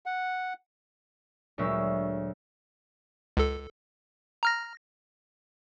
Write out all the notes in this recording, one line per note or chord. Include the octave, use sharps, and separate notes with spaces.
F#5
D2 A#2 F#3 G#3 E5 E6
C#2 A4
A#5 F6 A#6